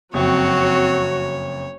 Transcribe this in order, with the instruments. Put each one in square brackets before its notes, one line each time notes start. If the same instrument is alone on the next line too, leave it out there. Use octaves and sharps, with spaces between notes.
[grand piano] F#1 F2 [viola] F#3 F#4 [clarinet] C4 [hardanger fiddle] C#5